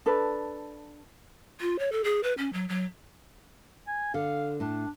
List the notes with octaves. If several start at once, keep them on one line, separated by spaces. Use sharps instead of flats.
D4 A4 B4
F4
C#5
A4
G#4
B4
C#4
F#3
F#3
G#5
D3 A4 F5
A2 D4 A5